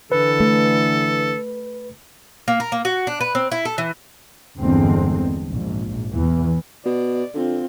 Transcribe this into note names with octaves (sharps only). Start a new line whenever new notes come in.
D3 E3 A4 B4
A3
A#3
A#4
A#3
F#4
D4
B4
C4
E4
A4
E3
G1 E2 D3 G#3 C4
A#1 G#2
E2 E3
B2 D5
D3 C4 F4